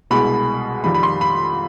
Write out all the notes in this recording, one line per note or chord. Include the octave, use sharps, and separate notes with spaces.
C2 B2 G#3 B5
F2 D#3 G3 B5
B5
C6
B5